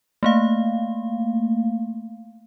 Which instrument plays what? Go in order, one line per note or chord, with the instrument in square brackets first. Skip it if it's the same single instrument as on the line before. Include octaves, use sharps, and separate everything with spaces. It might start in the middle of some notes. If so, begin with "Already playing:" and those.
[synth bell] A3 A#3 F5